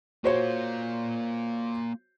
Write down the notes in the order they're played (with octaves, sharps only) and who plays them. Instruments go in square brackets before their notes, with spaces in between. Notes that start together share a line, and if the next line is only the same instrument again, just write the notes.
[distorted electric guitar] A#3 F4 [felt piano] F#4 C5 C#5